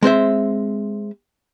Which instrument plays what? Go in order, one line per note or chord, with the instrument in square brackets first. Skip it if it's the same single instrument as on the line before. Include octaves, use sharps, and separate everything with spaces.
[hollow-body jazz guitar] G#3 C4 C5 E5